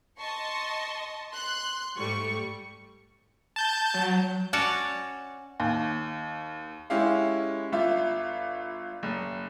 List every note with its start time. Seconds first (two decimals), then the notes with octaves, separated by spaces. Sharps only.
0.19 D#5 A5 C6 C#6
1.32 C6 F#6
1.96 G#2 G3 A3 C#6
3.56 A5 G6
3.94 F#3
4.53 C#4 F#4 C#5 D5 A5
5.60 D#2
6.90 G#3 C#4 E4 G4 F5
7.72 G1 F4 E5
9.03 F#1